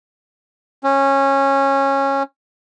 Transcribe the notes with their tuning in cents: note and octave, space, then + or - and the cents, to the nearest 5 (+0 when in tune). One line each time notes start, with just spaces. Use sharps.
C#4 -15